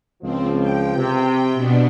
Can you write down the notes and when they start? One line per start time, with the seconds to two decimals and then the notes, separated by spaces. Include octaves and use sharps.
0.23 C#2 F3 C4
0.59 G5
0.97 C3
1.54 B2 B3 D4